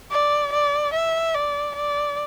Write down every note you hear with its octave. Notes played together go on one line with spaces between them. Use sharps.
D5
D5
E5
D5
D5